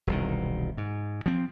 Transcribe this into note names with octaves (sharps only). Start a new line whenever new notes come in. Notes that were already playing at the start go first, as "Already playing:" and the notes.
E1 C2 D#3
G#2
F3 C4